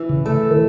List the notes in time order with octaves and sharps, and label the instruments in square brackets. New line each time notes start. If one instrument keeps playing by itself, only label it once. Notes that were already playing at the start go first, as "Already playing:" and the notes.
Already playing: [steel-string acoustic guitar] E3
[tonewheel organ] C#3
[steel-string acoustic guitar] A3
[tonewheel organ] D#3